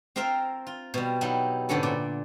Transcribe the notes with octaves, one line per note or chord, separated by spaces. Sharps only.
C4 F4 A#4 E5 F5
F4
B2 G3
F#3 G3 D#4 E4
G#2 B2 D3 B3 C#4 A4
A#2 D5